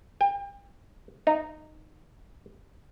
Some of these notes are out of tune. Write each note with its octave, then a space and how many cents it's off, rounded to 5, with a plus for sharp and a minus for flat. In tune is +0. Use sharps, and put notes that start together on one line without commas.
G5 +35
D#4 -15